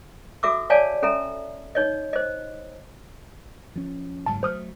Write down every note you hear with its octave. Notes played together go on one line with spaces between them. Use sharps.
F#4 A4 E5 D6 E6
C#5 D5 F5 G#5 A5
C#4 A4 E5 A#5
D#4 C#5 D#5
C5 D#5
F3 C#4
F#1 G#2 F#3 A5
F#3 A3 C5 D#6 F6